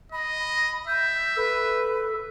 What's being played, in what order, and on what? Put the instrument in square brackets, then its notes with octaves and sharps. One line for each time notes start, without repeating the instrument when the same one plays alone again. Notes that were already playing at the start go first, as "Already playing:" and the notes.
[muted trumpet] D#5 [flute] B5
[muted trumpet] E5 [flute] G6
[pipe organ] A4 [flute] B4